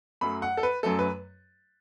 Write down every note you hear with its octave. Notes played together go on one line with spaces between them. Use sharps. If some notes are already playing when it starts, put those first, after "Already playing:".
F#2 F#3 A3 B5
F#5
A4
B4
F#2 F#3 A3 A4
B4